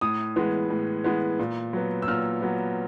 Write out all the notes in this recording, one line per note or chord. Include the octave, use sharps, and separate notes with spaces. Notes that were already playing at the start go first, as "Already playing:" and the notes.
A2 D#6
E3 G#3 B3
A2
E3 G#3 B3
A#2
F#3 B3
E6
A#2 F6
F#3 B3